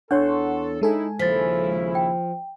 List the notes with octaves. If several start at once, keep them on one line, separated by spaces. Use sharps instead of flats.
E2 D4 A4 C#5 F#5 C6 C#6
G#3 D#4 E4 A4 G#5
D#2 C#3 F3 E4 A6 B6
G5